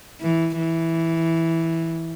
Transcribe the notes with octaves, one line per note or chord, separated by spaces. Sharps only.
E3
E3